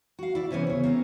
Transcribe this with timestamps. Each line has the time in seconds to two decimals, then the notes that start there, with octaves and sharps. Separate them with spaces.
0.19 F#4 F5
0.35 E4 D5
0.50 C3 E3 B3 C#4
0.67 C#3 C#5
0.84 A#3 C4 C#4